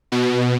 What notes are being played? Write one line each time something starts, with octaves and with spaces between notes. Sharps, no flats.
B2